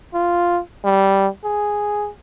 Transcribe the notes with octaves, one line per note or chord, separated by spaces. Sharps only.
F4
G3
G#4